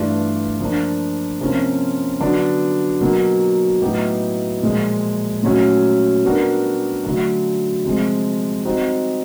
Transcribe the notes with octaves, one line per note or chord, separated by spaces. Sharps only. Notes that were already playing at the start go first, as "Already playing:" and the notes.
Already playing: G2 E3 A3 D4 F4
F3 A#3 D4
C3 F3 A#3 C#4 F4
D3 F#3 B3 D4
B2 F#3 A#3
A2 F#3 B3 D#4 G4
A#2 F3 G#3
A#2 F#3 A3 C#4
G3 B3 D4 F#4 A#4
D3 F#3 A3
C3 F3 G#3
G3 C4 D#4 F#4